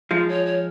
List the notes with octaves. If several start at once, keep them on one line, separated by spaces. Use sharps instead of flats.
F3 G#3 F4
C#5
C#5